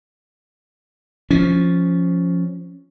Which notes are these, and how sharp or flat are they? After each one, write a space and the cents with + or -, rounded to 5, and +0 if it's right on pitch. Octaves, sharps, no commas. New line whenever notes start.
F3 +0 C#4 +0